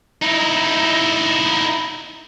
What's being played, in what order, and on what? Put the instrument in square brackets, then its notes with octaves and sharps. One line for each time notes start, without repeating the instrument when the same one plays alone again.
[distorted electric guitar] D#4 E4